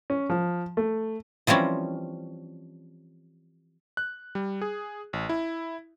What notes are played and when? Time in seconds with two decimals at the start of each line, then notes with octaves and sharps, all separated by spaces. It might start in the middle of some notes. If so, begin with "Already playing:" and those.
0.10 C#4
0.30 F3
0.77 A3
1.47 E3 F3 G3 C4 C#4
3.97 F#6
4.35 G3
4.61 G#4
5.13 A1
5.29 E4